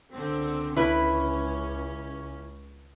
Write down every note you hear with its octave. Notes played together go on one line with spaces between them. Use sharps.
C#2 D3 C4
C#2 C#4 E4 B4